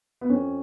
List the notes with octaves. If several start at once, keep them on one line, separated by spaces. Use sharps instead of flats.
B3
F2 C#4